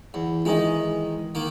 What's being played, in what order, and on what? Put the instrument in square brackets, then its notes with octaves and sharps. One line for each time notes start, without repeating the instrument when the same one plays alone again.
[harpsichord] E2
[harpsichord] D#3 G#3 [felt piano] E3 D#5
[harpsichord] D#3 A#3